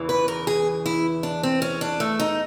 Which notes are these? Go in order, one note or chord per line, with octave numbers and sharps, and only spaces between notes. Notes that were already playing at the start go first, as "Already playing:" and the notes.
Already playing: E2 C#3 E3
B4
A#4
G#4
E4
D4
C4
C#4
D4
A3
D#4